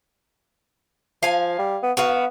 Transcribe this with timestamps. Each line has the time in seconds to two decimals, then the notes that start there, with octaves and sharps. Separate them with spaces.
1.23 F3 F5 G#5
1.59 G3
1.83 B3
1.97 B3 F#4 B4 F5